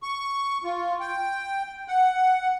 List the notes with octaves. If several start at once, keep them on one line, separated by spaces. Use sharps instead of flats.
C#6
F4
G5
F#5